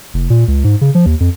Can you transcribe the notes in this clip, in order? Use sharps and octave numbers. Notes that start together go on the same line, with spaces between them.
F1
A#2
C#2
G#2
C#3
F3
D#2
F2